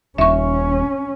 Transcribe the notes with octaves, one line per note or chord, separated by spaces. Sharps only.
D#1 C#4 E5 C#6